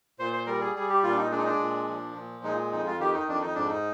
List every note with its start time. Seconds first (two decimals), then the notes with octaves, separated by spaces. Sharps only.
0.19 A#2 C5
0.33 C5
0.47 G3 A#4
0.61 G#4
0.75 G3 G#4
0.89 G4
1.03 A#2 F4
1.12 D4
1.18 D#4
1.31 G#3 D4
1.38 D#4
1.46 D4
1.60 A#2
1.88 F3
2.16 A#2
2.44 G#3 D#4
2.72 F2 D#4
2.86 F4
3.00 D#3 G4
3.14 D#4
3.28 F2 D4
3.42 D#4
3.55 G#2 D4
3.68 D#4